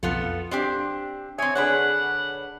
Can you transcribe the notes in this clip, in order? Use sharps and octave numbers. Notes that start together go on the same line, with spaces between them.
B1 F2 B3 F4 A4
F5
C4 D4 G4
C4 C#5 E5 G#5
D3 D4 G#4 B4 C#5 F#5